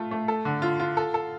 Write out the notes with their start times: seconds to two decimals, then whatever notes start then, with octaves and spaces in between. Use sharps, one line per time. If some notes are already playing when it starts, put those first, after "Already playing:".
Already playing: A3 F4
0.11 A3
0.28 A4
0.45 D3
0.62 F4
0.80 F4
0.97 A4
1.14 A4